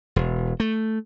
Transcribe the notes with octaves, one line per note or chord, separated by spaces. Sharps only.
E1
A3